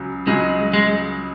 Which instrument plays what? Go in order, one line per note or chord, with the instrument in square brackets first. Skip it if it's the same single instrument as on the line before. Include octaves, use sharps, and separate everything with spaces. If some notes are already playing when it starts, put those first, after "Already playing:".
Already playing: [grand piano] C#2 C#3 F#3
[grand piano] C#2 C#3 F#3 [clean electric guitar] G#3
[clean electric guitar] G#3